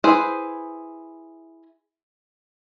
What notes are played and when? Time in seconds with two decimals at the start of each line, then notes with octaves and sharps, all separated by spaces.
0.04 E4 G#4 B4 C5